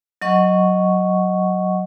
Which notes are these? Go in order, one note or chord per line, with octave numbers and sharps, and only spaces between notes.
F#3 D#5 F#5 C#6